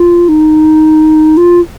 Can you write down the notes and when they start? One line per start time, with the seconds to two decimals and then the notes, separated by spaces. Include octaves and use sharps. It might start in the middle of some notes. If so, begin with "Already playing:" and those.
Already playing: F4
0.29 D#4
1.37 F4